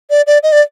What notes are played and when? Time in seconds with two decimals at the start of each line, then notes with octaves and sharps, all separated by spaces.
0.10 D5
0.27 D5
0.43 D#5
0.52 D5